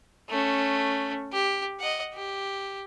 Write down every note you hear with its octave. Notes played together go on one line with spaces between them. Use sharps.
A3 C#4
G4
D#5 F#5
G4